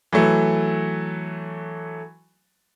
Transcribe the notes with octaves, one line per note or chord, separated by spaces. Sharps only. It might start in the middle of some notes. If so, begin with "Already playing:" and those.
E3 F#3 A3